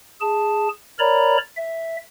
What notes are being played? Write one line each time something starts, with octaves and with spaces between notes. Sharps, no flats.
G#4 A5
A#4 C#5 D5 A#5 B5
E5